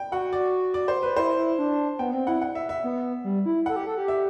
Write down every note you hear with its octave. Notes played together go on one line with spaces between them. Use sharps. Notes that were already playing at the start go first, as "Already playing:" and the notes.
Already playing: G5
F#4 F#5
D5
D5
C5
B4
E4 C5
E4
D4
B3 G5
C4
E4 F#5
F#5
E5
E5
B3
G3
E4
A4 F#5
G4
A4
G4
E5